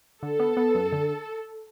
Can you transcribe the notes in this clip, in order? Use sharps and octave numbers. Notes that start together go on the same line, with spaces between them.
D3 A4
B3
B3
F#2
D3